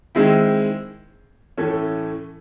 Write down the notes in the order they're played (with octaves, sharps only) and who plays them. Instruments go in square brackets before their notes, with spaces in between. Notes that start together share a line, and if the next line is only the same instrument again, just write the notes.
[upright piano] D#3 G#3 C4 E4
A2 E3 A3 C#4